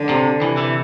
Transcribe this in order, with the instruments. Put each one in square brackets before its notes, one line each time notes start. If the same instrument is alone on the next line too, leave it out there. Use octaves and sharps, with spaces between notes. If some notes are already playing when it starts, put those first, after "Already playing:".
Already playing: [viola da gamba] D3
[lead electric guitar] C3
[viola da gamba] C3 [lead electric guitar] E3
[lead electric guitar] E3